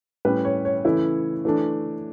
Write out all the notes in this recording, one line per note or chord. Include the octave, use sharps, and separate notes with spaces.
A2 G3 C#4 B4
C#5
C#5
C#3 E3 A3 E4
E3 A3 D4